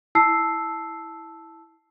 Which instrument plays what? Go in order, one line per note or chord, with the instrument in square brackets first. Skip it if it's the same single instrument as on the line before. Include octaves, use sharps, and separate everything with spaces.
[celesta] E4 A5 E6 C7